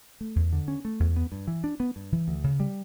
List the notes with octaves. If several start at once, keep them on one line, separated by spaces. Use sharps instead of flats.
A3
E2
D3
C#4
A3
E2
B3
G2
E3
D4
B3
G2
E3
D2
C#3
G3